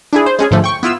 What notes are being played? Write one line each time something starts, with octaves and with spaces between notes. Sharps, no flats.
D4 E4 G#4
C5
G#3 C#4 G#4
G#2 D3 F3 A3
G5 C#6
B3 E4 F4 E6